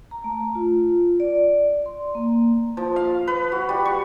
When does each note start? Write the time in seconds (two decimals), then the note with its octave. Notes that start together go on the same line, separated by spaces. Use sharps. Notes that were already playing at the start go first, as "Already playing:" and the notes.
0.11 A#5
0.24 A3
0.55 F4
1.20 D5
1.86 C6
2.15 A#3
2.77 F3
2.96 F5
3.27 B4
3.52 F#4
3.69 G3
3.85 C#6